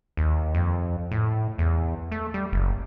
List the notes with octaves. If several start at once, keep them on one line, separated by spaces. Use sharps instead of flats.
D#2
F2
A2
E2
A3
G3
F#1